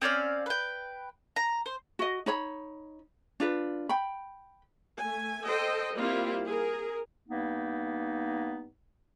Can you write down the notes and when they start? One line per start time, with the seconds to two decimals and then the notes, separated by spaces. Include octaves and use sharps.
0.02 C4 C#4 D5 F5
0.46 B4 G5
1.36 A#5
1.66 C5
1.99 F#4 D#5
2.26 D#4 C#5 B5
3.40 D4 F4 B4
3.89 G5 B5
4.99 A3 G#5
5.45 A4 C5 D#5 G5
5.95 G3 A#3 C4 E4 F4
6.45 G#4 A#4
7.29 G2 A#3 B3 D#4